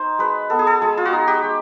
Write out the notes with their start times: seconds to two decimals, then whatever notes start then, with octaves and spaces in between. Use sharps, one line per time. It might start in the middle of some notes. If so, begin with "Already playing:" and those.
Already playing: D#4 C5
0.19 G#3 B4
0.50 B3 A4
0.59 G#4
0.67 A4
0.82 G#3 G#4
0.97 F4
1.05 F#4
1.13 D#4
1.28 G4
1.44 G#3